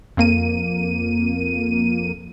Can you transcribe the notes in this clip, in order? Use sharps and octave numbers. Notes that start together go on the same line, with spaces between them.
F2 A#3 D#7